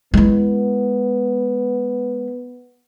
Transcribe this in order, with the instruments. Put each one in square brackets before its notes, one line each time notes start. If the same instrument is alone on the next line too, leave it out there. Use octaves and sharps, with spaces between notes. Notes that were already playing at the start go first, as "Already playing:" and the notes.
[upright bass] G#3 E4 [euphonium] B3